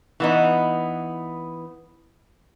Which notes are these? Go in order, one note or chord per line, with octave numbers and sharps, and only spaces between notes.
E3 B3 D#4